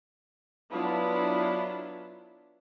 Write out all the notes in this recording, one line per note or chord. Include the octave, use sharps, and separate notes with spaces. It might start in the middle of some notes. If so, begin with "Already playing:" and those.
F#3 B3 D4 E4 F4